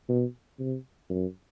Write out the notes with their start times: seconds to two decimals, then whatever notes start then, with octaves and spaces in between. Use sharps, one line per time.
0.09 B2
0.59 C3
1.10 F#2